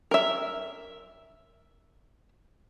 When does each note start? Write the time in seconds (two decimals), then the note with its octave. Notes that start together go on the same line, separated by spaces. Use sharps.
0.11 A#4 E5